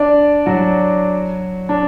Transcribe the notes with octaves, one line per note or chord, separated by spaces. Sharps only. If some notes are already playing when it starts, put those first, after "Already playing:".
Already playing: D4 D5
F#3 F#4
D4